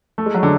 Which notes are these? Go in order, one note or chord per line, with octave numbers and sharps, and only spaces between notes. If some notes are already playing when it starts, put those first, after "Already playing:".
A3
G#3
F#3
D3